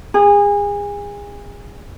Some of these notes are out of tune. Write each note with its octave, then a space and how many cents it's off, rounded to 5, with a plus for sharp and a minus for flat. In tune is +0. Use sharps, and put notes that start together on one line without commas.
G#4 -30